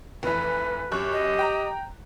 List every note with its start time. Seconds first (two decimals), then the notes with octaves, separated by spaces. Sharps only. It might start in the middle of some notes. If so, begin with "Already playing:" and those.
0.23 F1 E3 B4
0.92 F#2 G4 C#6 F#6
1.12 D#5
1.39 G5 A#5